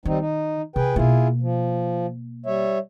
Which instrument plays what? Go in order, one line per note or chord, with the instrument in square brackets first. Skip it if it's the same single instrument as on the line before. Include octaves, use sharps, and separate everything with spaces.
[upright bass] D#3 [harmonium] G3 C4 D#4
[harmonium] D#4
[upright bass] C3 [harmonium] G#4 B4 G5
[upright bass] B2 A#3 [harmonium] E4 F4 G#4
[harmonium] F3
G3 C#5 E5